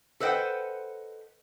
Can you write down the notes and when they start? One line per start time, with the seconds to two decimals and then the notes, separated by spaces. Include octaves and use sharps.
0.20 A4 B4 C5 D#5 F#5 G5